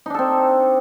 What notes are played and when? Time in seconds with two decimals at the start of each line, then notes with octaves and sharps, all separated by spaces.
0.06 D#4
0.10 D4
0.14 A4
0.19 C4